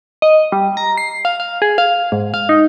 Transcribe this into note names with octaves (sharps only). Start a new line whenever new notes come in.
D#5
G3
A#5
C7
F5
F5
G#4
F5
G#2
F5
D#4